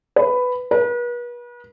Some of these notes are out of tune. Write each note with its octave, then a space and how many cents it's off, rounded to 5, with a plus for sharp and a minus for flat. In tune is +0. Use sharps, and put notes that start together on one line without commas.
B4 +10
B4 -40